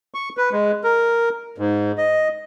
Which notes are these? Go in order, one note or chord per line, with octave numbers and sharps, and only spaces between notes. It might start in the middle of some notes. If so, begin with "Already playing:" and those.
C#6
B4
G#3
A#4
G#2
D#5